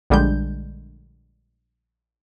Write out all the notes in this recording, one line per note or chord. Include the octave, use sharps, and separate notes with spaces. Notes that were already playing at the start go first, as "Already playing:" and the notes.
A#1 D3 G3 G#3 D4 G6